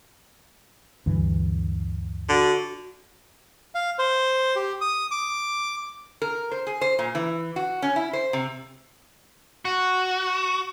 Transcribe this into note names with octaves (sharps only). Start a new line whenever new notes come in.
D2 G2 E3
D3 F#4
F5
C5
G4
D#6
D6
A#4
C5
G#4
C5
A#2
E3
F#4
C#4
E4
C5
C3
F#4